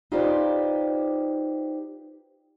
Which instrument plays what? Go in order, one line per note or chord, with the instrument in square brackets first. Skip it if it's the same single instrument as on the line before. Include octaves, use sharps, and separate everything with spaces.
[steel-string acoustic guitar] D#4 F4 G4 B4 C5 D5